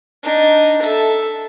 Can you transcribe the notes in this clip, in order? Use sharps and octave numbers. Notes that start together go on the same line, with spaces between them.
D4 D#4
A4 E5